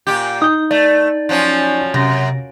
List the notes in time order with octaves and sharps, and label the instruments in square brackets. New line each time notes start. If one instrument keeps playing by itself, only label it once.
[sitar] A#2 G4
[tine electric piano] D#4 G6 [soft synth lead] D#6
[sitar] A3 [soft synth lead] D5
[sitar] F3 F#3 C#4
[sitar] F#2 [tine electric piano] C3 A#6